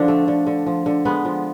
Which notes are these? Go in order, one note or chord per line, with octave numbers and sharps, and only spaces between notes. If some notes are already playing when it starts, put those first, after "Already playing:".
Already playing: D3 F3 D4
A3
D3
D3
F3
D3
G#3 B3
F3